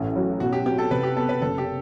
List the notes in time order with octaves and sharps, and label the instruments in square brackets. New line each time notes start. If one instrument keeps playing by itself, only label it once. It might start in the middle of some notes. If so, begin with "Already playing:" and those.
Already playing: [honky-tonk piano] A1 A3
F#3
[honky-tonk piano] B2 [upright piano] F#4
[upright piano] G4
[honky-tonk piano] C4 [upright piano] G4
[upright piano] A4
[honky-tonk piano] C3 [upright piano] B4
[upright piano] G4
[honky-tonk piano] B3 [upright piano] A4
[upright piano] B4
[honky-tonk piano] F#1 [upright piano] A4
[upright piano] G4